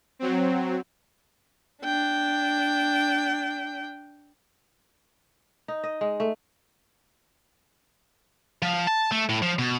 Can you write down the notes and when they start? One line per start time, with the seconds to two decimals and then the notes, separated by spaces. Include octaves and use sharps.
0.19 F#3 C4
1.84 D4 G5
5.68 D#4
5.84 D#5
6.01 G#3
6.20 A3
8.62 F3
8.87 A5
9.12 A3
9.29 A2
9.42 F3
9.59 B2